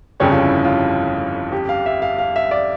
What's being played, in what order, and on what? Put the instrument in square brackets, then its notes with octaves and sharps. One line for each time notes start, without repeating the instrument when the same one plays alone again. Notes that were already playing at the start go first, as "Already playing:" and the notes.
[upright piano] G1 F2 C#3 G3 [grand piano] C#4
[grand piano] F4
E4
F4
G4
F5
E5
F5
F5
E5
D5